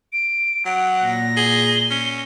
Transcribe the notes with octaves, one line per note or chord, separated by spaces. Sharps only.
D7
F#3 F#5
A#2 A#6
G#4 G7
C#4